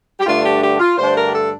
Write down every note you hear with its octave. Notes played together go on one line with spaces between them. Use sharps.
G4
G2 D3 A3 D4 F4
G4
G4
F4
G2 D3 A3 D4 C5
A#4
G4
A4